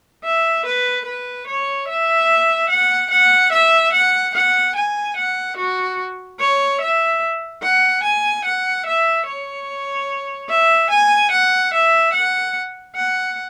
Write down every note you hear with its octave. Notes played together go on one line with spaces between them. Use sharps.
E5
B4
B4
C#5
E5
F#5
F#5
E5
F#5
F#5
G#5
F#5
F#4
C#5
E5
F#5
G#5
F#5
E5
C#5
E5
G#5
F#5
E5
F#5
F#5